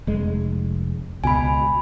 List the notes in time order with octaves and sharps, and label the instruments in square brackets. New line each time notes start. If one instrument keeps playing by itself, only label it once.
[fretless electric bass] F1 G#3
[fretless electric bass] C#2 B2 [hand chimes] G#5 B5